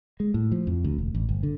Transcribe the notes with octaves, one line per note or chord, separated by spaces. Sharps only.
G#3
A2
F3
F2
D2
E1
A1
G1
D3